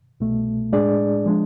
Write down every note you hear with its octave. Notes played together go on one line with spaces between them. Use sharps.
C2 B2 A3
A2 G#3 D4 G#4 D5
F3 G#3 D4